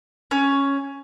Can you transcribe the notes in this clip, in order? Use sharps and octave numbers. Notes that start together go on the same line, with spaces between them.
C#4